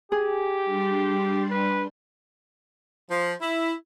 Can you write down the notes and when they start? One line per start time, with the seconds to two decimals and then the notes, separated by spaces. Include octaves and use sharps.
0.12 G4 G#4
0.64 G3 D4 C6
1.51 B4
3.10 F3
3.41 E4